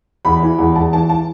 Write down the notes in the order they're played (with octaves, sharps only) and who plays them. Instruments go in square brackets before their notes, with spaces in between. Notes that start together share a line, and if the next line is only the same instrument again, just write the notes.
[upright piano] E2 B5
E3
E2
E2 A5
E3 A5
A5